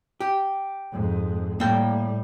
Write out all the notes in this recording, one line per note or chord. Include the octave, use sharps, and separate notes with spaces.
G4
F2 G#2
A2 G3 A#3 G5